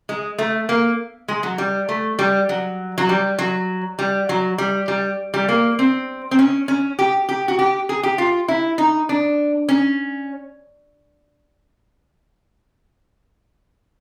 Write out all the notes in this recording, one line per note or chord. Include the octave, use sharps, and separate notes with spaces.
G#3
A3
A#3
G#3
F#3
G3
A3
G3
F#3
F#3
G3
F#3
G3
F#3
G3
G3
G3
A#3
C4
C4
C#4
C#4
G4
G4
F#4
G4
G#4
G4
F4
E4
D#4
D4
C#4